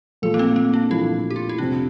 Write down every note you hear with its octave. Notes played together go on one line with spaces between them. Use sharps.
A#2 F3 A3 A4
A#3
C4
A#3
D4
A#2 F3 A3 E4
G4
F4
E4
F2 C3 G3 C4 D4